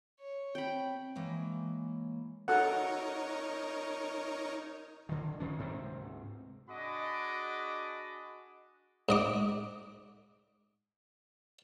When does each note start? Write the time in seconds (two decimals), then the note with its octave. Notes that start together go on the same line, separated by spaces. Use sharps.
0.20 C#5
0.55 C4 G5 B5
1.15 E3 G#3 A#3 C#5
2.48 D#4 F#4 A4 A#4 C#5 F#5
5.09 D3 D#3
5.40 D#3 C#4
5.58 D2 G#2 C3 C4
6.69 D4 F#4 G#4 D#5 B5 D6
9.09 G#2 D#5 D6